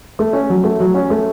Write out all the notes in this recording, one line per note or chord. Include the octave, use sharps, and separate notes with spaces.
A3
C#4
F#3
A3
F#3
C#4
A3